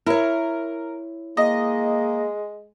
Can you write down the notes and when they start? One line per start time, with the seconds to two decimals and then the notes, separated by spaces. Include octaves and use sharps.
0.06 E4 A#4 C#5
1.37 G#3 A#3 D#5